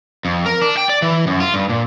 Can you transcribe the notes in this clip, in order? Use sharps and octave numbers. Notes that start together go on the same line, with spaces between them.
F2
A#4
D4
G5
D5
E3
F#2
F4
G2
A#2